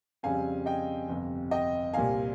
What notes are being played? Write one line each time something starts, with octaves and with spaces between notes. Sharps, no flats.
F2 C#3 G3 C4 F5 G#5
D#5 G5
G1 F2 C3
D#5 G5
C2 A#2 G3 C4 F5 G#5